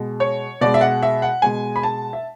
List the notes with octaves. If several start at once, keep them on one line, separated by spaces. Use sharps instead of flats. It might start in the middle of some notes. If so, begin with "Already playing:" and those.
Already playing: B2 G#3
C#5
B2 G#3 D5
E5
F#5
E5
F#5
B2 G#3 G#5
B5
A5
E5